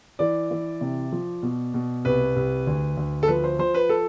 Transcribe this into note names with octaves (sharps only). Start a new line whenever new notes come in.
E3 D5
E3
C3
F3
B2
B2
C2 B4
C2
D2
D2
A4
F3 B4
C5
F3 C5
B4
A4